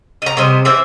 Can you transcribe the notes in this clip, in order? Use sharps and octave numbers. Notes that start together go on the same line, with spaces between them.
D#5 A#5
C3 G3 C5 D#5
E3 C5 E5